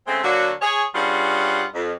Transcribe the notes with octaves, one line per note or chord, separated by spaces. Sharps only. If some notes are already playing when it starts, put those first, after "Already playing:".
C#3 G#3 A3 C4
D3 F#3 A#3 D4 F#4
G#4 C#5
G2 G3 C#4 F4 G#4 F#5
F2